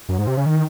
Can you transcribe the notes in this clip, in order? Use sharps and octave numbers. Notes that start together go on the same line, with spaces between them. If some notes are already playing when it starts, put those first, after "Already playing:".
F#2
G#2
C3
C#3
D#3